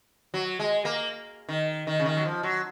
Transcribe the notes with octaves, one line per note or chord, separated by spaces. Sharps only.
F#3
G#3
A#3
D#3
D#3
C#3
D#3
F#3
F3
F#3